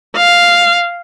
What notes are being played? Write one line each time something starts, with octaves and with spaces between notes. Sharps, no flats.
F5